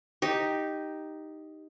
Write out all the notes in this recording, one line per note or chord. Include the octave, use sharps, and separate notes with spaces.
D#4 G4